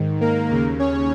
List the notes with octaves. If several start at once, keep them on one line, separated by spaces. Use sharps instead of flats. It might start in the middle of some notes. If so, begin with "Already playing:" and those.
Already playing: G#2 D#3
A#3 A#4
D#2 C#3
C#4 C#5